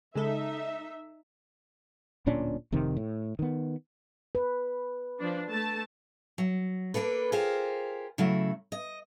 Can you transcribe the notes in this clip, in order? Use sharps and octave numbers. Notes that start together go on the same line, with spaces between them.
C#3 G#3 D#4 A4 E5
D1 A#2 C#4 D4
F1 C3 D#3
A2
D#3 B3
B4
F3 D4
A3 A5
F#3
A#3 D4 A4 B4
F4 G4 G#4 A#4 C5
C#3 F#3 A3 E4
D#5